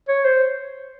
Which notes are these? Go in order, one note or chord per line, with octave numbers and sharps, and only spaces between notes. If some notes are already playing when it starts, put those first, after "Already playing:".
C#5
C5